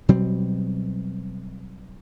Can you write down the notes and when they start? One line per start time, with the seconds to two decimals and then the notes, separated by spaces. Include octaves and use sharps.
0.09 B2 F#3 G3 C4